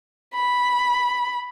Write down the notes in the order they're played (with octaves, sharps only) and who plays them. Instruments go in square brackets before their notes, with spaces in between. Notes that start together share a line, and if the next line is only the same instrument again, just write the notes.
[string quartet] B5